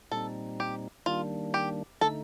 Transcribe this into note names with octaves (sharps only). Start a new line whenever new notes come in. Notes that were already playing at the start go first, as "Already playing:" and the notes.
A#2 G3 C4 D#4 A4
G4
D#3 G3 A#3 D4 F4
G4
D3 A3 D#4 A4